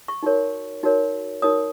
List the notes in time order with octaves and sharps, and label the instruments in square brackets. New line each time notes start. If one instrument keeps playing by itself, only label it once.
[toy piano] C#6
D#4 F#4 A#4 C#5
D#4 F#4 A#4 C#5
D#4 F#4 A#4 C#5 D#6